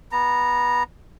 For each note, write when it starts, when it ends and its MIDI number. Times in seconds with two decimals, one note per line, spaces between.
0.12 0.83 59
0.12 0.83 82